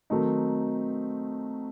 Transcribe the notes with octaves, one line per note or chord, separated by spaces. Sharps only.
D#3 F#3 A3 C4 D#4